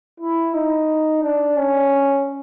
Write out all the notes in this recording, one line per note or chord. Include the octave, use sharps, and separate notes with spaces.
E4
D#4
D4
C#4